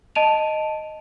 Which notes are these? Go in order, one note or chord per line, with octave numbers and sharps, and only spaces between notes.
D#5 A5 D7 D#7 F7